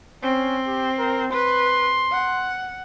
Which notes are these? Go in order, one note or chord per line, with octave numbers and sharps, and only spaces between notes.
C4 C#4
G4
A#4
B4 C6
F#5